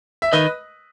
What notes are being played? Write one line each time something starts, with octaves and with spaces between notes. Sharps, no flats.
E5
D#3 B4 D#5